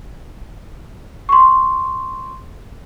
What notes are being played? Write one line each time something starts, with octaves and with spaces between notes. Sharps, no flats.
C6 C#6